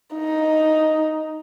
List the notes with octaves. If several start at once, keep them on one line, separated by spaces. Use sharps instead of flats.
D#4